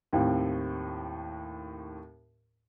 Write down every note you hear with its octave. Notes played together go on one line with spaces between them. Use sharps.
D#2 A2 C4